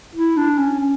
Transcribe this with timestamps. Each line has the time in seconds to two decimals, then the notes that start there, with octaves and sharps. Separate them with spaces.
0.15 E4
0.37 D4
0.58 C#4
0.80 C#4